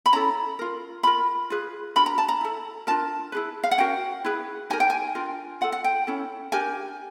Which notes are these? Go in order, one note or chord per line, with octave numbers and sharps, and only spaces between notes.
B5
C#4 E4 A4 A#5
F4 A#4
F4 A#4 B5
F4 G#4 B4
D4 F#4 A#4 B5
A#5
A5
A#5
E4 A4
D4 F4 A#4 A5
E4 G#4 B4
F5
F#5
C#4 F#4 A#4 G5
E4 G#4 B4
D#4 G4 A#4 G#5
G5
G#5
D4 F4 A#4
F4 A4 F#5
F#5
G5
C#4 E4 A4
D4 G4 A#4 G#5